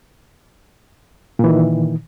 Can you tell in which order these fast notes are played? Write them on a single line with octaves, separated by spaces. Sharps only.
A#2 E3 D#3